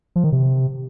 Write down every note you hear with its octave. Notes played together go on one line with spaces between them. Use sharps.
F3
D#3
C3